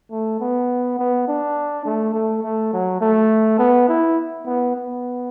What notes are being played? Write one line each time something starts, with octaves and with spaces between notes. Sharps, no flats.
A3
B3
B3
D4
A3
A3
A3
F#3
A3
B3
E4
B3
B3